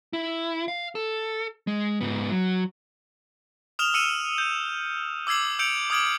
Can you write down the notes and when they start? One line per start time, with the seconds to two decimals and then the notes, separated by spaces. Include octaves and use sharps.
0.13 E4
0.68 F5
0.95 A4
1.67 G#3
2.01 G#2 B3
2.31 F#3
3.79 D#6 F6 E7 F7 G7
3.94 E6 C#7 D#7 E7
4.38 G6
5.27 D6 E6 G#6 C7 F#7
5.59 E6 G6 C#7 D7 F7
5.90 D6 D#6 F6 G#6 D7 F#7